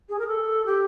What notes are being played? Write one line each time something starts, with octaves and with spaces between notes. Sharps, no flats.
G#4
A#4
A4
G4